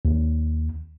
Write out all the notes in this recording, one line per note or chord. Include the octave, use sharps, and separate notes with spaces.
D#2